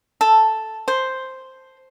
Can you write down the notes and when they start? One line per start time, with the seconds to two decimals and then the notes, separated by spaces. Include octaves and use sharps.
0.21 A4
0.88 C5